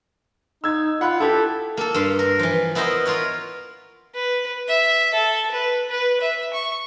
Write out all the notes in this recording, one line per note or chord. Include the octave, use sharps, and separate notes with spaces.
D#4 E6 G#6
F4 F#5 B5 F#6
E4 G4 A4
A#3 A4
G2 F5 C6
A#4
E3 F3
B3 E4 A#4 C5 D#5
F4 A#4 B4 C#5
B4
E5
A4
B4
B4
E5
C#6